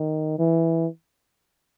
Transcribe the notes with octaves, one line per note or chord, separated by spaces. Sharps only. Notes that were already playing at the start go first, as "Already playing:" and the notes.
Already playing: D#3
E3